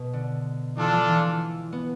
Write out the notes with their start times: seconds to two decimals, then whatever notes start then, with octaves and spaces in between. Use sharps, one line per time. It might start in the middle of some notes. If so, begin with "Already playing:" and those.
Already playing: B2
0.13 D3
0.77 E3 D4 F4 A4
0.93 F3
1.09 E3
1.73 B3